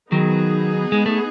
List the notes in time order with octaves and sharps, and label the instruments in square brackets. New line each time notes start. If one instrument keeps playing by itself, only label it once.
[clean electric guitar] D#3 F#3 [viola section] B3 D#4 G#4
[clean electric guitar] G#3
A3